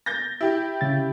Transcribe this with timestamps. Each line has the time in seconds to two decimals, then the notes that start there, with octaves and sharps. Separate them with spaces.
0.06 G6 A6 A#6
0.41 E4 G4
0.81 C#3 A6